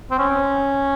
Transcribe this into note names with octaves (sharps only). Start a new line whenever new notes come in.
C4
C#4